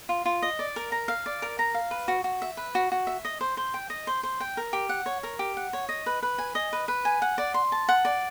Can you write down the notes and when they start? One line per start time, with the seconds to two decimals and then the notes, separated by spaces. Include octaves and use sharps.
0.09 F4
0.25 F4
0.42 D#5
0.59 D5
0.76 A#4
0.92 A#5
1.08 F5
1.26 D5
1.42 A#4
1.59 A#5
1.74 F5
1.91 B4
2.08 F#4
2.24 F#4
2.42 E5
2.57 B4
2.75 F#4
2.92 F#4
3.07 E5
3.25 D#5
3.41 C5
3.57 C5
3.74 G5
3.90 D#5
4.07 C5
4.23 C5
4.40 G5
4.57 A#4
4.73 G4
4.89 F#5
5.06 C#5
5.23 A#4
5.39 G4
5.57 F#5
5.73 C#5
5.89 D#5
6.06 B4
6.23 B4
6.38 G#5
6.55 D#5
6.73 B4
6.88 B4
7.05 G#5
7.22 F#5
7.38 D5
7.54 C6
7.72 A5
7.89 F#5
8.05 D5